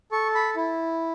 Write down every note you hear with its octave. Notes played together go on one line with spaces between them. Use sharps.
A4 C#6
B5
E4